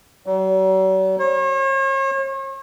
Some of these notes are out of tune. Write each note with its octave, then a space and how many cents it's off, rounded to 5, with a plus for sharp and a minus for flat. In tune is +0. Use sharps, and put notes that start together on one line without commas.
F#3 +45
C#5 -45